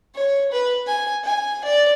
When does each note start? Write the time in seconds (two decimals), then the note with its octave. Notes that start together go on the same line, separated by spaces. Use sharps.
0.14 C#5
0.51 B4
0.86 G#5
1.23 G#5
1.64 D5